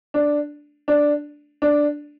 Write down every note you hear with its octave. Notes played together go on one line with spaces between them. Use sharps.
D4
D4
D4